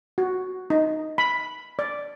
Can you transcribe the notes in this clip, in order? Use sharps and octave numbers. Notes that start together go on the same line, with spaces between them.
F#4
D#4
B5
D5